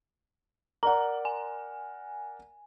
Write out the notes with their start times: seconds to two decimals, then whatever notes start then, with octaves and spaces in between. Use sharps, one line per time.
0.83 A#4 D5 F#5 A#5
1.25 G#5